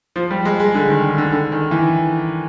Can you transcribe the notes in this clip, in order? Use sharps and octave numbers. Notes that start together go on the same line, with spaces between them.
F3
G3
G#3
G#3
D3
D#3
D3
D3
D3
D#3
E3